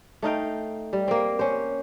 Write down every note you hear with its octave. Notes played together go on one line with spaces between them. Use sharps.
A3 D#4 F5 G5
G3
A#3 C4
C#4 C5